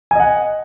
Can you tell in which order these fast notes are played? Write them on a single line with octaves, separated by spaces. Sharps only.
G#5 D#5 F#5